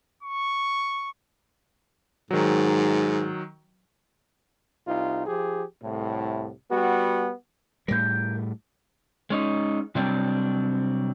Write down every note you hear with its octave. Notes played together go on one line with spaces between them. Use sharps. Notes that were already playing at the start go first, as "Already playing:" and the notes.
C#6
G#2 D#3 F#3
C2 D#4 F4
F3 G4 G#4
C2 A2
G3 B3 F#4
A2 G3 A#4 G6
G#3 C#4 D#4
C3 F#3 G3 C4 D4